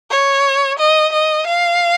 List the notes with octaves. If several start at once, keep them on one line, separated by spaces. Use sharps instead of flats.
C#5
D#5
D#5
F5